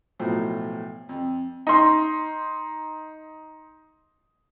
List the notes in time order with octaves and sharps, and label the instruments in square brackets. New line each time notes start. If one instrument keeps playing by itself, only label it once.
[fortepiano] B1 A2 F3 F#3
F2
[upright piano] D#4 C6